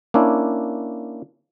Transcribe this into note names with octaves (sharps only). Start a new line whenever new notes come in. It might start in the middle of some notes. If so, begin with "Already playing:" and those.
A#3 C#4 D4 E4